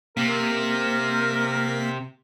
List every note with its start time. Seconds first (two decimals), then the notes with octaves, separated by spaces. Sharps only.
0.17 C3 A#3 A#4 B6